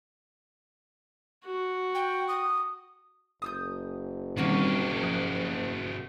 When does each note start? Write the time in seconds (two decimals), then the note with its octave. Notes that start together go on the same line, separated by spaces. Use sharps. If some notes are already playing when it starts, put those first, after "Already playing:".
1.45 F#4
1.95 G5
2.28 D#6
3.42 F#1 D#6 E6 G6
4.37 B2 D#3 G3 A#3 C4 C#4 F#4 G4
5.02 F3 D#6 F#6